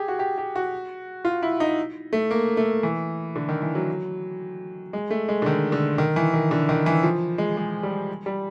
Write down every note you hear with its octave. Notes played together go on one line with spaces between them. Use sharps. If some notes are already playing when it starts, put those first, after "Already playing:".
Already playing: G4 G#4
F#4
G4
G4
F#4
F4
E4
D#4
A3
A#3
A3
E3
D3
D#3
E3
F#3
G#3
A3
G#3
D3
D#3
D3
D#3
E3
D#3
D3
D#3
E3
F3
G#3
G#3
G3
G3